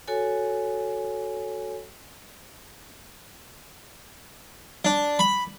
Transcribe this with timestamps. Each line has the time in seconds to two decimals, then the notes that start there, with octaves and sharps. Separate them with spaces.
0.08 F#4 A4 C#5 G#5
4.85 D4
5.19 B5